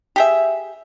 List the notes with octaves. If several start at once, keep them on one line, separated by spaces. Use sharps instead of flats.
G4 G#4 E5